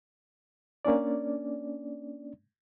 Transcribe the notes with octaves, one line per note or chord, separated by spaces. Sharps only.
A#3 C#4 D4 D5